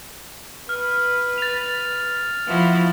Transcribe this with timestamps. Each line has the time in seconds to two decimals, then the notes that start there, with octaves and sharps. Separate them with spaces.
0.69 B4 F6
1.38 A6 F7
2.47 F3 E4 F#4